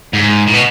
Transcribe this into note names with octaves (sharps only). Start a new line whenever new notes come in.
G#2
A2
B2